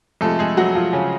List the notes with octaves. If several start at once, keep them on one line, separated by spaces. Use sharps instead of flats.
F2 C3 F3 G#3 A3 A4
G#3 G#4
F#3 F#4
F3 F4
C#3 C#4